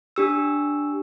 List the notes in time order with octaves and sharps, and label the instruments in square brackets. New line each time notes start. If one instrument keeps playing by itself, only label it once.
[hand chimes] D4 G4 E6